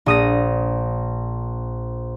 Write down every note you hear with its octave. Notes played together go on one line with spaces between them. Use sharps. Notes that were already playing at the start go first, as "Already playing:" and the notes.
A#1 D#6 A#6